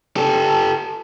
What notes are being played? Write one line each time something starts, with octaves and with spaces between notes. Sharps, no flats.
G4 A4